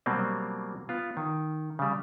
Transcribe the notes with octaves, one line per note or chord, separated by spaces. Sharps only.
B2 F#3 G3 A#3 C4
B3 F4
D#3
C#3 G3